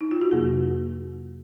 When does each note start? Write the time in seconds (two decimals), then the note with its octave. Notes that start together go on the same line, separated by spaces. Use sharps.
0.01 D#4
0.11 F4
0.21 F#4
0.31 F2 C3 F#3 A#3 G#4